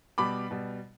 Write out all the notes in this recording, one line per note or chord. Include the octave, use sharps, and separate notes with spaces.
B2 G3 B5 D6
B2 G3